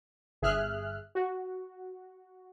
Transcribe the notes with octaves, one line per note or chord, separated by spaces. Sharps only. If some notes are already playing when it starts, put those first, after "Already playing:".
G1 G#4 E5 F6 F#6
F#4